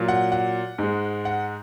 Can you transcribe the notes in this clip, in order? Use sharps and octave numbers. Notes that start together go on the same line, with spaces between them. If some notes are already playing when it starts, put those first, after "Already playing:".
Already playing: A#2 F#3
F#5
F#5
G#2 G#3
F#5